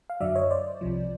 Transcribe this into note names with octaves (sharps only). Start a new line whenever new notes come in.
F5
F#2 D3 F#3 D5 E5
C#5 D#5
C5 D5
C2 C3 F3